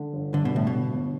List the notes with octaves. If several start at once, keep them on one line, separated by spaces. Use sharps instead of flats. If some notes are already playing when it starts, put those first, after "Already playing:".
Already playing: D3
G1
G2 D3
B2
G1 A2
B2
G1
G1